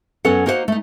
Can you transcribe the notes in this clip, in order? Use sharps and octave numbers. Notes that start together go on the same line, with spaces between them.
F#2 F#3 B3 C#4 A4 F#5
A#3 D#4 F#4 C5 C#5 F#5
A3 D#4